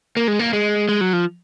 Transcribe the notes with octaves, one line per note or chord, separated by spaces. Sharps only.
A#3
G#3
A#3
G#3
G#3
F#3
F3